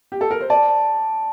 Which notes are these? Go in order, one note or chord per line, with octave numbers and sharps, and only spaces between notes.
G4
A4
A#4
C5
D5 A5